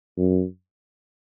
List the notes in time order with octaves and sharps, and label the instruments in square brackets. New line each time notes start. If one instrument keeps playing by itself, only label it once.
[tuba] F#2